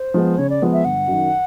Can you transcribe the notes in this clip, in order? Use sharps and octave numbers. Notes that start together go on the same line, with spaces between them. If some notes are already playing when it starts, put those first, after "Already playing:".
Already playing: C5
F3 G#3 B3
C#3 C#5
D5
F3 G#3 B3
E5
G1 F#5
F#2 D#3